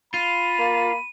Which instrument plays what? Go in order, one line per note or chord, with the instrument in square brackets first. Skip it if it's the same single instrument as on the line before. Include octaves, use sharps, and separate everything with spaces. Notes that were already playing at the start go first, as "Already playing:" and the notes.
[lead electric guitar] F4 [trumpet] B5 [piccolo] D#7
[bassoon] A#3